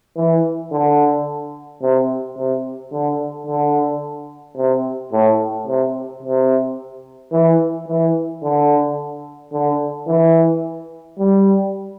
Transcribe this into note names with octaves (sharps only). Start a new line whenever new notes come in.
E3
D3
C3
C3
D3
D3
C3
A2
C3
C3
E3
E3
D3
D3
E3
G3